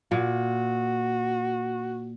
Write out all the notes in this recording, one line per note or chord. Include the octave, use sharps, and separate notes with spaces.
A#2 F#4